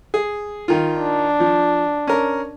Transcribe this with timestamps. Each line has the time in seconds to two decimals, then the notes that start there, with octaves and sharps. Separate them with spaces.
0.14 G#4
0.68 D#3 F4
0.99 D4
1.40 F3
2.07 C#4 A#4